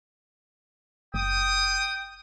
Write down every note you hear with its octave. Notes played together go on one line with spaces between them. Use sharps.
F#1 G5 D#6